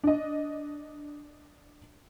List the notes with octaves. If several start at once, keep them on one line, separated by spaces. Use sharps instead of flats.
D4 D#5